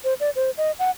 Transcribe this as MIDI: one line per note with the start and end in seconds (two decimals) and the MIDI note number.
0.04 0.14 72
0.20 0.30 74
0.36 0.51 72
0.57 0.72 75
0.79 0.91 78